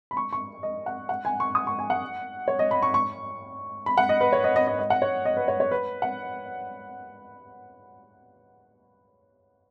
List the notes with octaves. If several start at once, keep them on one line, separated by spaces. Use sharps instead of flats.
B5
C#6
C#6
D#5
F#5
F#5
G#5
C#6
D#6
C#6
G#5
F#5
C#5
D#5
B5
C#6
C#6
B5
F#5
D#5
B4
C#5
D#5
D#5
D#5
D#5
F#5
C#5
D#5
B4
C#5
C#5
B4
F#5